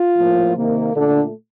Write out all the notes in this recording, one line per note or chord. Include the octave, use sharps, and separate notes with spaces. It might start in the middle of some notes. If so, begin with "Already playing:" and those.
Already playing: F4
A2 F3 A#3
C3 D#3 A#3
A#2 D3 A3 D4